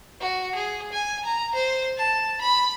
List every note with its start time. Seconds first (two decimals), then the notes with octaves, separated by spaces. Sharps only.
0.20 F#4
0.55 G#4
0.92 G#5
1.25 A#5
1.54 C5
1.97 A5
2.41 B5